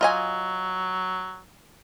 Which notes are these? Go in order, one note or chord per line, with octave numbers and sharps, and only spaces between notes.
F#3 F4 D#5 G#5